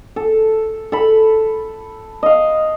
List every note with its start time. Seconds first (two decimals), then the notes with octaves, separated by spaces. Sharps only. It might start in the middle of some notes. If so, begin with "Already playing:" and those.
0.16 A4
0.92 A4 B5
2.23 D#5 F5